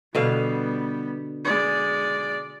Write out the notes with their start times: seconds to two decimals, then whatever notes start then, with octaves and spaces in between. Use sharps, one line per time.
0.15 B2 D3 G3 B3 F5
1.45 G#3 D5